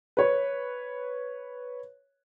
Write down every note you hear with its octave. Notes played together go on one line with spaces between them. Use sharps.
B4 C#5